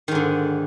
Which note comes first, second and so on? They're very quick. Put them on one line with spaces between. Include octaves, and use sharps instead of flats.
D#3 G#2 D3